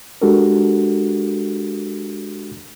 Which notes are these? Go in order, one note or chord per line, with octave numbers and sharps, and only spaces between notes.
G#3 D4 F#4 G4 A4 A#4